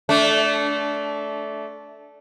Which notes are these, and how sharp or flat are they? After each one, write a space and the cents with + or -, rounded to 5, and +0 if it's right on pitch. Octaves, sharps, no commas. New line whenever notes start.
A3 -15 D4 -25